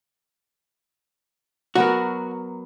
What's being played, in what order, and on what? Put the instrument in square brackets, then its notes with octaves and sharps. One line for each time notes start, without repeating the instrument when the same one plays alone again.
[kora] F#3 B3 A#4 [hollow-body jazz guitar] F#4